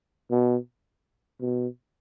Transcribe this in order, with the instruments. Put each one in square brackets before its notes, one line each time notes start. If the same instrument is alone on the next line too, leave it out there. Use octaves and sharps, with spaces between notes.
[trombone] B2
B2